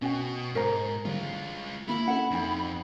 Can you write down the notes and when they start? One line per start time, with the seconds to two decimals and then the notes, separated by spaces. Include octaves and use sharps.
0.02 B2 C#4 F#4 G5
0.55 G#2 A#4 C5 A#5 A#6
1.05 D3 E3 G3 G#3 F4
1.88 D#3 A#3 E4 F4 B5
2.08 C#4 F#4 A4 F#5
2.31 F2 D#4 G5